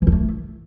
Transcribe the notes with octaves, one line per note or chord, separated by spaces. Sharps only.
E3
D4
A3